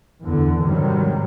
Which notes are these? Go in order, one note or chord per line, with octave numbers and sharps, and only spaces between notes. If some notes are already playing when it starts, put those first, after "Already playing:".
E2 D3
G#2 C3 D#3 F#3 G3